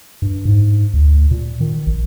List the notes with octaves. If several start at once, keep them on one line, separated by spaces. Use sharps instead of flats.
G2
G#2
D2
A#2
D#3
A#1